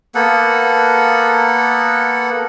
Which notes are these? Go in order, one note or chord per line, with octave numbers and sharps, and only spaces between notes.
A#3 B3 A4 F#5